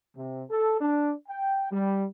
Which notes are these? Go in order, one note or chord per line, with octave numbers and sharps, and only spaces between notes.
C3
A4
D4
G5
G3